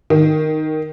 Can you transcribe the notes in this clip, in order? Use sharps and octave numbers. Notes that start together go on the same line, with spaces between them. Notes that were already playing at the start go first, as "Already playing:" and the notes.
D#3